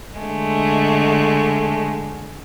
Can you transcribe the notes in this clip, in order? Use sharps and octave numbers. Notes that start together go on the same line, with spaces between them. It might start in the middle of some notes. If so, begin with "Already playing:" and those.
D3 G#3 A3